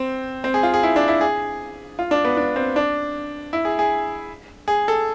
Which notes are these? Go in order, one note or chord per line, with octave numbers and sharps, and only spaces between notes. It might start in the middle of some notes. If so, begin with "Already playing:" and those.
Already playing: C4
C4
G#4
F4
G#4
E4
D4
E4
G#4
F4
D4
B3
D4
C4
D4
E4
G#4
G#4
G#4
A4